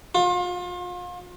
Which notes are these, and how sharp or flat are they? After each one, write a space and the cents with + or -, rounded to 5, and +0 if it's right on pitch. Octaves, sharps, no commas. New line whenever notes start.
F4 +35